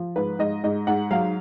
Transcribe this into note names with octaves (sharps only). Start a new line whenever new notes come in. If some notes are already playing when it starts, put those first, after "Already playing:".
Already playing: F3
G#2 B4
G#2 D#5
G#2 D#5
G#2 F#5
F#3 F5